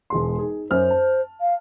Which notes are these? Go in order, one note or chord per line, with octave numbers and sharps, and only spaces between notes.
E1 G#3 C6
D#4 G#4
F#2 C#4 C5 F6
A5
F5